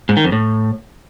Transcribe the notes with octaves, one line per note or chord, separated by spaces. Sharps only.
G#2
D#3
F2
A2